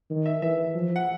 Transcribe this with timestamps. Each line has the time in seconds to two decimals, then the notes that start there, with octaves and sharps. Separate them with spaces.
0.10 D#3
0.26 E5
0.42 E3 E5
0.75 F3
0.96 F#5